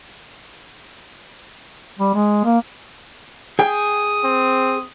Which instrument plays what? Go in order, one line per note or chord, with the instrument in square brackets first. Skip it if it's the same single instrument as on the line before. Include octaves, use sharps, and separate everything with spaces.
[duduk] G3
G#3
A#3
[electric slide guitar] G#4 G5 [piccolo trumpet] D#6
[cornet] C4